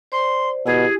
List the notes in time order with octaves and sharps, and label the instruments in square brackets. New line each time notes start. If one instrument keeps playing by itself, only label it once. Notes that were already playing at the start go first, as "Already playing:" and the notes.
[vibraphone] C5 D5 [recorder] C6
[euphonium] B2 [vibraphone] E4 G4 [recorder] G#4